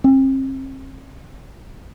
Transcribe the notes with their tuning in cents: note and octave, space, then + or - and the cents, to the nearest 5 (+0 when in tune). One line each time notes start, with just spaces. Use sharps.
C4 +40